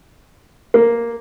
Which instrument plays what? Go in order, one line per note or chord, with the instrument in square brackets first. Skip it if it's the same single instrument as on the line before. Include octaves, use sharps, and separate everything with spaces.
[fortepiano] A#3